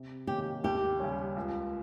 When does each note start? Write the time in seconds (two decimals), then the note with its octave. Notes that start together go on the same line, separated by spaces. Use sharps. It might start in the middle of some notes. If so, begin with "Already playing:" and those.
Already playing: C3
0.27 D#3 A#3 C#4 G4
0.64 D#2 G4
1.00 C#3 G3 C#4
1.37 C#2